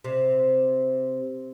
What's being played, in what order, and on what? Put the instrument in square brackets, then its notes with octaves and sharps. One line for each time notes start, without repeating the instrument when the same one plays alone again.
[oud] C3